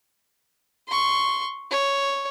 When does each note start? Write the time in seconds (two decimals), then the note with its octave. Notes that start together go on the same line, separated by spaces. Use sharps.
0.88 C6 C#6
1.71 C#5